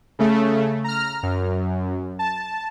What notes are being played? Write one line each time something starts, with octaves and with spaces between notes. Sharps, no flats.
C#3 A3
A#5 F6
F#2
A5